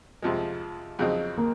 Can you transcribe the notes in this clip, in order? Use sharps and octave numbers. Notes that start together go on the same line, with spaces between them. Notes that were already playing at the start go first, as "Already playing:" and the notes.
F2 C3 F3 G#3
F2 C#3 F#3 C4 D#4
A#3